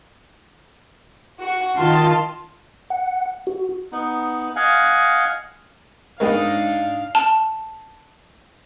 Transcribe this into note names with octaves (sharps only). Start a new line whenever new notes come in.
F#4
D#3 F4 A5 C6
F#5
F#4
B3 D#4
D#5 F5 F#5 G#5
G#2 D#3 G#3 B3 D4 D#4 F5
A5